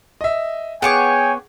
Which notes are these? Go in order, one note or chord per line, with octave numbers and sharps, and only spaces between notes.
D#5 E5
B3 G#4 C#5 G5 G#5 C#6 D6